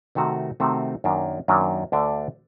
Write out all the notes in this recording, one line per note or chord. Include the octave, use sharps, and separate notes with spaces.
C3 D#3 A3 C4 F#4
C3 D#3 A3 C4 F#4
F#2 D#3 F#3 A#3 D4
F#2 D#3 F#3 A#3 D4
D2 D3 A3 D4